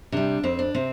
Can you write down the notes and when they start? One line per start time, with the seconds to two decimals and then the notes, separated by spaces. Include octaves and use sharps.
0.12 C3 G3 D4
0.43 F2 C4
0.59 D4
0.74 C3 C4